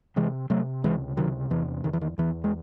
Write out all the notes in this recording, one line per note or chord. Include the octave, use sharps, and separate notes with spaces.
C3 E3 G#3
C3 F#3 A3
C#2 E3 G#3
C3 D#3 F#3
E2 E3
E2 D#3
E3
D#3
E2 E3
G#3